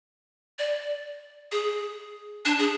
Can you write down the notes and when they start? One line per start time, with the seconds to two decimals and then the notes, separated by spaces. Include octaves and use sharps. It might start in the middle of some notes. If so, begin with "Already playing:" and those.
0.59 D5
1.52 G#4
2.45 D4
2.59 G#4